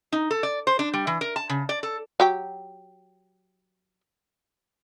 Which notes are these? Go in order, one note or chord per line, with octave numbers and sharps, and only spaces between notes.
D#4
A4
D5
C5
D4
G3
E3
A#4
A5
C#3
D5
A4
F#3 G4 G5